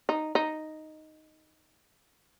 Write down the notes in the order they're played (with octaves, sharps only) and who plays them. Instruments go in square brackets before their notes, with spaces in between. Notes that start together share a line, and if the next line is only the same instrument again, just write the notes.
[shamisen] D#4
D#4